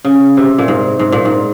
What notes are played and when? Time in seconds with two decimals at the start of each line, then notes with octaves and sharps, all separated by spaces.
0.04 C#3
0.37 C3
0.58 A#2
0.68 G#2
0.99 G#2
1.12 A#2
1.25 G#2